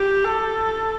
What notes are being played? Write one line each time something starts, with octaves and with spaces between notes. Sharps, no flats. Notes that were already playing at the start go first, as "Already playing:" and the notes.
Already playing: G4
A4